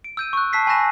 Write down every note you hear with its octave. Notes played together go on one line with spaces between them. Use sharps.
D7
E6 G6 D#7
C#6 F#6
A5 E6 B6 C7
G#5 B5 C#6 F#6 A#6 E7